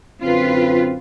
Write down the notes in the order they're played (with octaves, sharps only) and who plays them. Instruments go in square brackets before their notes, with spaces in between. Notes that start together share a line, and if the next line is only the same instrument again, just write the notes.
[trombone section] F#2 D3 C4 [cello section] F4 B4